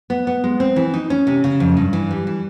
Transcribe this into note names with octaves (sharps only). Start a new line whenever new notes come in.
B3
B3
G#3
C4
E3
D#4
C#4
C3
C#3
F2
G2
E3
G3
E3